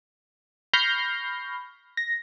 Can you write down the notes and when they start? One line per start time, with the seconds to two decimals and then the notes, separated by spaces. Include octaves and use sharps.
0.73 B5 C#6 F6 G6 A#6 C7
1.97 A#6